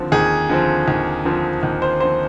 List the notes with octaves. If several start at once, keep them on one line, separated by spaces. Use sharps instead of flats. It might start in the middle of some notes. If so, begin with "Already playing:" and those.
Already playing: D#2 D3 F3 C4
D#2 G#4
D3 F3 C4
D#2
D3 F3 C4
D#2
C5
D3 F3 C4 C5